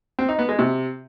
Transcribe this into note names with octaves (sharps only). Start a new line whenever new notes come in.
C4
D#4
B3
G#3
C3